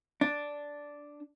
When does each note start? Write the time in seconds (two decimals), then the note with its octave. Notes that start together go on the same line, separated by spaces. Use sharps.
0.21 D4